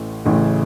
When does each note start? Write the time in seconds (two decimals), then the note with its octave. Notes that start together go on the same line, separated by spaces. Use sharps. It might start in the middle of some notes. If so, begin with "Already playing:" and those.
Already playing: A1 A2 E3 A3
0.26 A1 A2 C#3 E3 A3